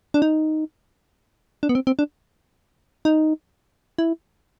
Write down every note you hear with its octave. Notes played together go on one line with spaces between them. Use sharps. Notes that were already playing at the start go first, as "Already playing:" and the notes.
D4
D#4
D4
B3
C4
C4
D4
D#4
E4